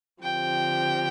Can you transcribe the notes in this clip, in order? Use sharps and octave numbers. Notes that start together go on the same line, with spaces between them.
D3 F3 C4 G4 G5